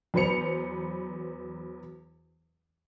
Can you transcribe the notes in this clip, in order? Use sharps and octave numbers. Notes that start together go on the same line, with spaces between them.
E2 F#3 B4 C5 C#7 F7